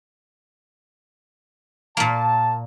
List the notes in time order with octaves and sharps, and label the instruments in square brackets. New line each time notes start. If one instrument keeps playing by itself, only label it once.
[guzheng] A#2 A#3 [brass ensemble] A5